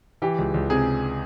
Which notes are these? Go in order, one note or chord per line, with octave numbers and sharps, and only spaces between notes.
E3 G4
C#2
C#2
C3 G#4